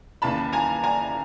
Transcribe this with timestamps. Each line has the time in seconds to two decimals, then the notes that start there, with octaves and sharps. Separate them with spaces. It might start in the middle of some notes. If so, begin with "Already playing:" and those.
0.22 D#2 C#3 E3 A5 B5
0.52 G#5 A#5
0.83 G#5 A#5